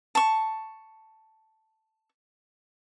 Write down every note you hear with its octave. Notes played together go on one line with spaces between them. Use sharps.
A5 C#6